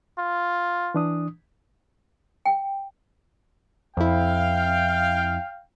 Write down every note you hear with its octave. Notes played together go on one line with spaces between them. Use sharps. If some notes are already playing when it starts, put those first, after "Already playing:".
F4
E3 D4 D#6
G5
F2 E4 F5 G5